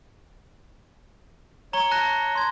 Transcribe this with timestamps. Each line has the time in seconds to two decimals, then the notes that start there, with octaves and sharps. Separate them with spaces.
1.73 C#5 A#5 G7
1.91 A5 F#6 A#6
2.36 C6 G#6